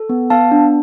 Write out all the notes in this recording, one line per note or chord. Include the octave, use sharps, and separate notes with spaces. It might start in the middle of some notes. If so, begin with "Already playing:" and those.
Already playing: A4
B3
B3 F5 A5
D4